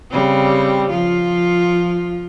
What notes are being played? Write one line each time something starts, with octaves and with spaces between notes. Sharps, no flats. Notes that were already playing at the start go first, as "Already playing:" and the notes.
C#3 G3 C4
F3 F4